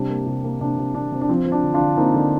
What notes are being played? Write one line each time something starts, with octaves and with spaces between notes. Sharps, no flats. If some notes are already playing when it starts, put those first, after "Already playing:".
Already playing: C3 G3 D4
A#3
C3
A#3
C3 D4
C3
C3 D4
C3
D4
F3 C4
F3
D4
D3
D4 F4
D3
A#3 C4 D#4
D3